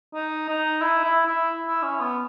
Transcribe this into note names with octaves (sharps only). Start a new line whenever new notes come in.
D#4
D#4
E4
E4
E4
E4
C#4
B3